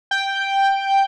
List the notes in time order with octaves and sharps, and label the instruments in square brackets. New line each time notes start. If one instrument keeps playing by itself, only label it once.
[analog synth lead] G5